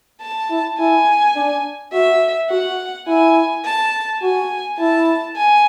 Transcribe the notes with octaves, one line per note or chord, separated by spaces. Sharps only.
A5
E4
E4 G#5
D4
F#4 E5
F#4 F#5
E4 G#5
A5
F#4 G#5
E4 A5
G#5